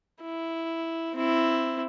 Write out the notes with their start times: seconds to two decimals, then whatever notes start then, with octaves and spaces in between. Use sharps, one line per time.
0.22 E4
1.14 C4 E4